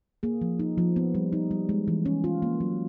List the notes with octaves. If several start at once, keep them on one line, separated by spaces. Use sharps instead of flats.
A#3 G#4
F3
D#4
F3
B3
G3
D#4
G3
G#3
E3
C#4
F4
A#3
F#3